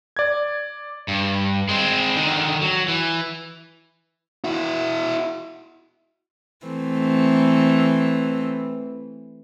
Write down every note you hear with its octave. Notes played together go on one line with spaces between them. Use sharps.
D5 G#6
G2
G#3 C4
D3 D#3
F#3
E3
E4 F#4
E3 A3 C4